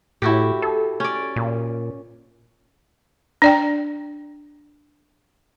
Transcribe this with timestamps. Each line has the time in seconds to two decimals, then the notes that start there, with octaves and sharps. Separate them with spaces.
0.22 A2 E4 F#4 G4
0.62 A4
1.00 C#4 D5
1.36 A#2
3.42 D4 D5 G5